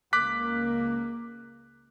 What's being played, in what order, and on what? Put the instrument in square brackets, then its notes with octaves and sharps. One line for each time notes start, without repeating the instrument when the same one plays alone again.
[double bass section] C#2 A#3 [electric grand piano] D6 F#6 B6